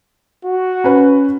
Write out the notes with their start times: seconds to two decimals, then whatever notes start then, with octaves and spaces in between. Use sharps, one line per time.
0.45 F#4
0.84 C#4 B4